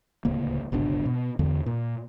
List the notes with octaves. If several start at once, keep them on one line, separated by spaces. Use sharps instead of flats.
D1 C#2 A#3
G1 C#2 B2 D4
B2
E2 D3
A#2